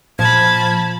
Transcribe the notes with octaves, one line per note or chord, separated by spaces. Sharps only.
A#2 F3 A5 B5 G#6